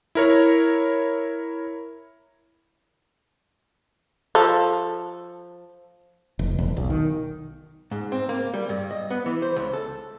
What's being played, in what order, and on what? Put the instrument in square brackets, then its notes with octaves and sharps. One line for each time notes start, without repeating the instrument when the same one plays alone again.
[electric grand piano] E4 A#4 C#5
[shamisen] F3 A4
[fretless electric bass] F1
E1
B1
D#3
[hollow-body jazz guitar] G#2
C4
A#3
G3
G2
D#5
B3
E3
C5
C#2
A4